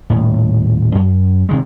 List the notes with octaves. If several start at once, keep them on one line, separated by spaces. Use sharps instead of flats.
D#1 A2
F#2
C3 D#3 G#3